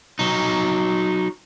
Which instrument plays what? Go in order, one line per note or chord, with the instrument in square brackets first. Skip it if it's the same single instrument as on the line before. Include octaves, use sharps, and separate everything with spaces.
[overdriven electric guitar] F#3 D#4